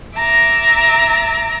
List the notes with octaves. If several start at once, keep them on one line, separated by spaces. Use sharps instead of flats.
E5 A#5 D6 A6